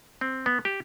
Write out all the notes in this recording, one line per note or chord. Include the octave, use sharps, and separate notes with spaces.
C4
B3
G4